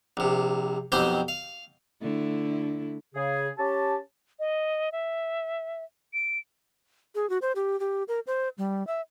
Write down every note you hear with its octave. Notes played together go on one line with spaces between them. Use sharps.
A#1 C3
B1 F2 C4 G4 C5
F5
D3 A3 E4
C#3 G#4
C#4 G4 A5
D#5
E5
D7
G#4
F#4
C5
G4
G4
A#4
C5
G3
E5